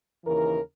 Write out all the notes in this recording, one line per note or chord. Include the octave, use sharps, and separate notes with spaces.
D#2 C#3 E3 A#4